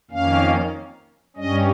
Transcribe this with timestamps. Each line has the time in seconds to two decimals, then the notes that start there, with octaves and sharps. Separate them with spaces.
0.11 F2 D#3 A#3 C#4 F5
1.36 G2 G3 C#4 D#5